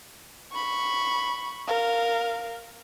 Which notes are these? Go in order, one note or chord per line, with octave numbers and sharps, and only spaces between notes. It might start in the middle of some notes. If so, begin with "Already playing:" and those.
B5 C#6
A#4 F5